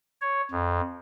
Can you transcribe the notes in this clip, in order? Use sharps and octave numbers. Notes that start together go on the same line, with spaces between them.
C#5
F2